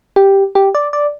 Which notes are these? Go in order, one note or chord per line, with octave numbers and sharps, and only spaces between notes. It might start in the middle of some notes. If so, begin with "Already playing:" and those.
G4
G4
D5
D5